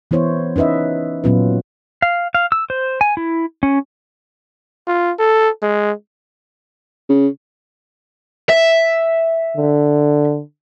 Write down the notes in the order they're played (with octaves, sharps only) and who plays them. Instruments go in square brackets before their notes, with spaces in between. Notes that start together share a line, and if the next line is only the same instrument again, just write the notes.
[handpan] E3 B3 E4 C5 C#5
C#4 D#4 B4 D#5 E5
A#2 F#3 B3 C#4 F4 B4
[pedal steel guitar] F5
F5
E6
C5
G#5
E4
C#4
[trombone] F4
A4
G#3
[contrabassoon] C#3
[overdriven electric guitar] E5
[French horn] D3